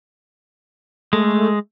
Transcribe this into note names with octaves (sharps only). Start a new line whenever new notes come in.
G#3 A3